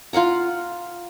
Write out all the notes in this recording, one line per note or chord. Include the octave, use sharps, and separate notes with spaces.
F4 F5 F#5 A#5